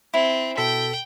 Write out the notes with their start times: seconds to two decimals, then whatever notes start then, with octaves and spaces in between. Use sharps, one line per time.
0.14 C4 E4
0.57 B2 A4 G5 B6